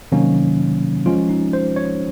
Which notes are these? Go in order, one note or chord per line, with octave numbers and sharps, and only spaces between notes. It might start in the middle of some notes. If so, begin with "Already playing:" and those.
C3 D#3 F#3 A#3 C#4
F3 G#3 C#4 F4
D#4
C5
C#5